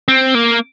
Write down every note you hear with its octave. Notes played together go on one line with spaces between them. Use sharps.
C4
A#3